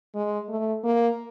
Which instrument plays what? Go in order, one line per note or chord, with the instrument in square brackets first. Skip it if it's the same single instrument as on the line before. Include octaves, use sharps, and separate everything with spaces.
[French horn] G#3
A3
A#3